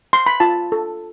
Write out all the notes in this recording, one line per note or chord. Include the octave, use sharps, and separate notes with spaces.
C6
B5
F4 A5
A4